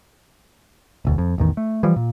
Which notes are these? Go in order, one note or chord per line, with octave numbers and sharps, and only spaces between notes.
E1 D2
F2
A1 E2 D#3
A3
E3 F3 G3
A#2